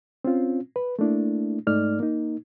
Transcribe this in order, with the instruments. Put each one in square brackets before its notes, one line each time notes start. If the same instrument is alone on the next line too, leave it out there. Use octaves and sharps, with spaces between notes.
[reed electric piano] C4 C#4 F4
B4
A3 A#3 D4 E4
G#2 A3 D#4 D5 F6
A#3 D#4